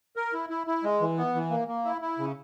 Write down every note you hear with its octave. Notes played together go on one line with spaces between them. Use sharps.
A#4
E4
E4
E4
G#3
E3
B3
E3
A#3
A#3
E4
E4
C#3